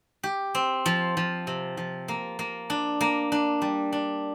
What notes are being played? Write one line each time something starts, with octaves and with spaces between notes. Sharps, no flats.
G4
C4
F3
F3
C3
F3
A#3
A#3
D4
A#3
D4
G3
D4